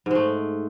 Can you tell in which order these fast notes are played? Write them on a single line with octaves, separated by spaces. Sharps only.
G#2 G#3 A3